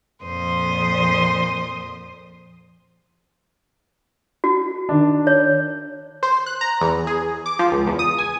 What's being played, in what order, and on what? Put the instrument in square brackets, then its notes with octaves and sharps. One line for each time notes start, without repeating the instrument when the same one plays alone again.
[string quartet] F2 A#2 C5 D#6
[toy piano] F#4
[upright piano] D#3 D4
[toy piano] C#5
[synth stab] C5
F#6
A#5
E2
G#4
D6
F3
C#2
E2
D#6
G#5